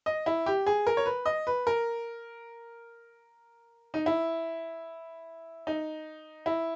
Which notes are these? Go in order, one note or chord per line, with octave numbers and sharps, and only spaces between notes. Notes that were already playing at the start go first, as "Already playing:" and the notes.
D#5
E4
G4
G#4
A#4
C#5
B4
D#5
B4
A#4
D#4
E4
D#4
E4